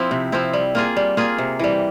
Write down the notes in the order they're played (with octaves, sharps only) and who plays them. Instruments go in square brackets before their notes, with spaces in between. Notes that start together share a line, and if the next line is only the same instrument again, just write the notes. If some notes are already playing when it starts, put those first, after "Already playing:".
Already playing: [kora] F3 C4 E4
C3
F3 C4 E4
G3
A#3 F4 G#4
G3
A#3 F4 G#4
C3
E3 G3